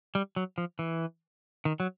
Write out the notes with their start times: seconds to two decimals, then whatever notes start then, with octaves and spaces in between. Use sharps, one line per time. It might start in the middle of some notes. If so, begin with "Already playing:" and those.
0.15 G3
0.36 F#3
0.58 F3
0.79 E3
1.65 D#3
1.80 F#3